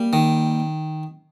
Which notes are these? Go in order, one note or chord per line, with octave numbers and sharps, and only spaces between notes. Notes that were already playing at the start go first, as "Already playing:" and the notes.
Already playing: G3 A#3
D#3